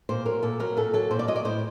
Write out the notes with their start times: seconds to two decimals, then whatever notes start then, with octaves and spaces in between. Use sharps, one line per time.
0.09 A#2 C5
0.25 F#3 A#4
0.43 A#2 A4
0.60 F#3 A#4
0.77 A#2 A4
0.94 F#3 A4
1.11 A#2 C5
1.19 D5
1.28 F#3 D#5
1.36 D5
1.45 A2 C5